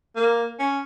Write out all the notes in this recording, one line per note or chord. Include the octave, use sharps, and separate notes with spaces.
A#3
C#4